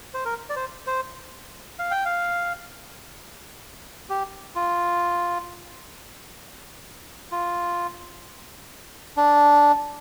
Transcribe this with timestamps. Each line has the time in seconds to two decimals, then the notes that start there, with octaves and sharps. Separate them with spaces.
0.14 C5
0.25 A#4
0.49 D5
0.56 C5
0.87 C5
1.79 F5
1.91 G5
2.05 F5
4.09 G4
4.55 F4
7.32 F4
9.17 D4